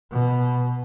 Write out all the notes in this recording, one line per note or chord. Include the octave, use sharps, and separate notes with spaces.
B2